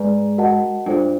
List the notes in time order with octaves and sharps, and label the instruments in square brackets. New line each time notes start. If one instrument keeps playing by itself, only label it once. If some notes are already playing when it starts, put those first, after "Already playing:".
Already playing: [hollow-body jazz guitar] G#2 [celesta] G#4 B4 D5
[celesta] F#4 A#4 D#5 F#5 A5
[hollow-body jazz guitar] G2 [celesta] D4 F4 A4 C5